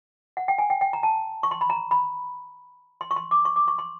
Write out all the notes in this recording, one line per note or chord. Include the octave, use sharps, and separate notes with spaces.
F#5
G5
G#5
G5
G5
A#5
A5
C#6
C6
B5
A#5
B5
C6
C#6
C6
D6
C#6
D6
C#6
C6